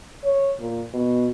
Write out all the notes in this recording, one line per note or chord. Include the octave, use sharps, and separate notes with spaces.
C#5
A#2
B2